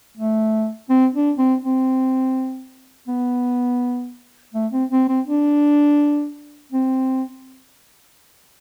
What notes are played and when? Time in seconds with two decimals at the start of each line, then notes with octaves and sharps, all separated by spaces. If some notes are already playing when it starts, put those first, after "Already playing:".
0.17 A3
0.90 C4
1.15 D4
1.38 C4
1.62 C4
3.08 B3
4.54 A3
4.72 C4
4.91 C4
5.08 C4
5.27 D4
6.72 C4